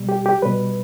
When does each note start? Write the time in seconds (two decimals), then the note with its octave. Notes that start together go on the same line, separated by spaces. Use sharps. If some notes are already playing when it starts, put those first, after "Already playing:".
Already playing: B2 G3
0.09 G4
0.26 G4
0.42 B2 G3 B4